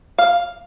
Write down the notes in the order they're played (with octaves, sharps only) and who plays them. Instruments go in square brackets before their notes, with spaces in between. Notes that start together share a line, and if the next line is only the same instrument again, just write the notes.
[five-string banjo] F5